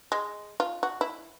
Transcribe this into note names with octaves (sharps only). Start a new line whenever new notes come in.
G#3
F4
F#4
E4